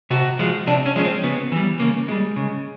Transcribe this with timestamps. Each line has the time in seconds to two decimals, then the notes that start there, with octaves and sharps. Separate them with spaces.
0.10 C3 F#4
0.39 F3 G#3
0.67 C3 D4
0.86 C#4
0.96 F3 G#3 C#4
1.05 C4
1.23 C#3 B3
1.52 E3 G3
1.80 C#3 A#3
2.08 E3 G3 G#3
2.36 C#3